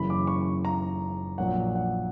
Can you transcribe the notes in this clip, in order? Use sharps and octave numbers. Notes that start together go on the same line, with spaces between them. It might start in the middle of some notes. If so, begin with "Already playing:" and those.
Already playing: F#1 F#2 C#3 E3 B5
D6
C#6
A#5
A#1 A#2 F#3 F#5
F#5